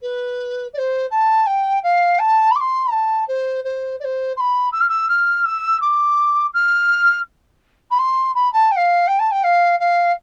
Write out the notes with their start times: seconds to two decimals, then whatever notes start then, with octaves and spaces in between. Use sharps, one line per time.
0.02 B4
0.73 D5
0.78 C5
1.10 A5
1.46 G5
1.83 F5
2.19 A5
2.51 B5
2.55 D6
2.60 C6
2.91 A5
3.27 C5
3.64 C5
4.00 D5
4.04 C5
4.36 C6
4.40 B5
4.72 E6
4.80 F6
4.88 E6
5.08 F6
5.45 E6
5.81 D6
6.54 F6
7.90 B5
7.98 C6
8.35 B5
8.52 A5
8.71 G5
8.76 F5
9.07 G5
9.19 A5
9.31 G5
9.43 F5
9.79 F5